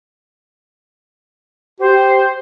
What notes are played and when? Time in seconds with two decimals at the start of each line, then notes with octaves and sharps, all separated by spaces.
1.80 G4 C5